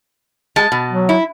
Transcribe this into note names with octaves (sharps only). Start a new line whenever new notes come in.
G#3 A5
B2
F#3
E4